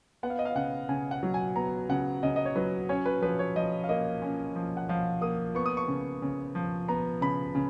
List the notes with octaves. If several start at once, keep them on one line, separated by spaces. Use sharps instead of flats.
B3 F#5
F5
D#5
F5
C#3 F#5
C#3 G#5
F#5
F#3
G#5
B3 A#5
C#3 F#5
C#3 D#5
D#5
C#5
F#3 B4
C#4 C#5
B4
F3 B4
C#5
F3 D#5
F5
A#3 D#5
C#4
F3
F#5
F3 F5
A#3 D#6
B3 C#6
D#6
C#6
C#3
C#3
F3
B3 A#5
C#3 B5
C#3